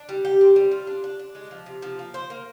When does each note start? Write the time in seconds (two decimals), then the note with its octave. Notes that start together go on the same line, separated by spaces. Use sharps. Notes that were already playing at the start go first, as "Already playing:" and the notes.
Already playing: D4
0.09 G3
0.25 G4
0.41 C4
0.56 G3
0.71 F4
0.87 D4
1.04 D4
1.19 D4
1.35 G#3
1.51 F3
1.66 C3
1.82 F3
1.99 A#3
2.14 C5
2.30 A#3